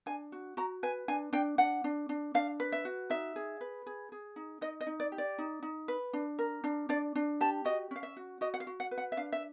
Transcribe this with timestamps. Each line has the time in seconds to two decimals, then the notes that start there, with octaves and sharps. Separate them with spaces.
0.06 D4 G#5
0.32 F#4
0.57 F#4 A#5
0.83 B4 G#5
1.08 D4 G#5
1.33 D4 G5
1.58 D4 F#5
1.84 D4
2.09 D4
2.34 D4 F5
2.60 B4
2.72 E5
2.85 F#4
3.10 D#4 E5
3.36 G#4
3.61 B4
3.87 G#4
4.12 G#4
4.36 D#4
4.61 D#4 D#5
4.81 D#5
4.87 D#4
5.00 D5
5.12 G4
5.18 D5
5.38 D#4
5.63 D#4
5.88 B4
6.13 D4
6.39 A#4
6.64 D4
6.89 D4 D5
7.15 D4
7.41 G4 A5
7.65 F#4 D#5
7.91 C#4 F5
8.03 E5
8.17 F#4
8.41 F#4 D#5
8.54 F#5
8.60 F5
8.67 F#4
8.80 F#5
8.91 B4
8.98 F#5
9.12 E5
9.17 D4 F5
9.32 E5